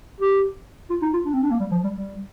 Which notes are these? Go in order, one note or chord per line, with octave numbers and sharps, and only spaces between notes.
G4
F4
D#4
F4
D4
C4
D4
A#3
G3
F3
G3
G3